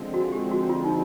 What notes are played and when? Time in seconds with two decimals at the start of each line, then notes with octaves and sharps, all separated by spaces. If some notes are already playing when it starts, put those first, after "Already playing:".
Already playing: D3 F3 G#3 C4
0.14 F#4
0.32 G4
0.51 F#4
0.69 F4
0.84 D#4